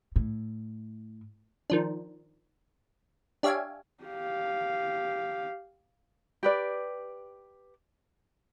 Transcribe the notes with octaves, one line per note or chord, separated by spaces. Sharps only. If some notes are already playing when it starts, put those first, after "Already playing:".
A2
D#3 F3 D4
D4 G4 C#5 E5 F5 G#5
G4 F5
G4 B4 D5